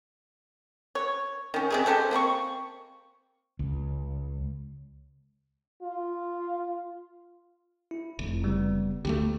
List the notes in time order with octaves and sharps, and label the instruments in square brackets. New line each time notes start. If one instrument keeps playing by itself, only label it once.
[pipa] C#5
D#3 C#4
C3 E3 G#4
G#3 G4 A4 C5
A#3 C4 B5 C#6
[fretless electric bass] C#2
[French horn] F4
[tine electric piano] E4
[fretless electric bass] F1
[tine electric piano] C#3 G3 B3
[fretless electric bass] D2 F#3 A3 [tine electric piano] G4